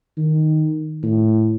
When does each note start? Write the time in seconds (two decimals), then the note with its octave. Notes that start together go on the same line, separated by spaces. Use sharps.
0.17 D#3
1.03 A2